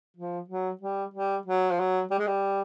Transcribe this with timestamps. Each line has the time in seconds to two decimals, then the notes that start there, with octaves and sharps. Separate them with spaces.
0.17 F3
0.48 F#3
0.81 G3
1.14 G3
1.46 F#3
1.71 F3
1.79 F#3
2.11 G3
2.19 G#3
2.27 G3